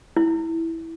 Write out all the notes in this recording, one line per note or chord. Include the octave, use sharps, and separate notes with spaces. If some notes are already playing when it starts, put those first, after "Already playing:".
E4